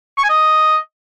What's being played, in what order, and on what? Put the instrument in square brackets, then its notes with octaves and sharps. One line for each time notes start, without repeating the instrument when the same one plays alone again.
[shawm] C#6
G#5
D#5